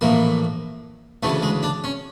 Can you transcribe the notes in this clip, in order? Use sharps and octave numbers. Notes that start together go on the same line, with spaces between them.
A#1 A2 E3 A#3
D2 C#3 E3 A3
G#3
D4
C#4